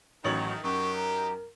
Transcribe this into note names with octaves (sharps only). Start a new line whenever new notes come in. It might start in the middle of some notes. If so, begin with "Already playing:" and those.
A1 D#3 F#3 A3 F#4 C#5 F#7
F#2 F#3 D#4 G4 A#4 C#6
A#5